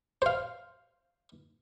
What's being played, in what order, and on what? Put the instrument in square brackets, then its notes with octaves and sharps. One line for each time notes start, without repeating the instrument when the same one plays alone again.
[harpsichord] C5 F5